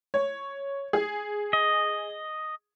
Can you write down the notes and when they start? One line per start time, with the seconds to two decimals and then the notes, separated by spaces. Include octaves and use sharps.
0.14 C#5
0.93 G#4
1.53 D#5